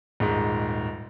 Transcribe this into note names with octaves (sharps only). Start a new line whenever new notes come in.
D#1 G#2